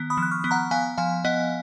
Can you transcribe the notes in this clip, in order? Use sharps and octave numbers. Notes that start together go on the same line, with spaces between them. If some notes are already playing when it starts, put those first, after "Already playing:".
Already playing: D#3 B3
B5 D#6
F3
F#6
C#6 F6
B3
F#5 A#5
B3 F5 G#5
F3 F5 G#5
B3 D#5 F#5